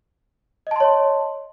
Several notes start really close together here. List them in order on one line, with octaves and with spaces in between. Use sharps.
D#5 A5 C6 C#5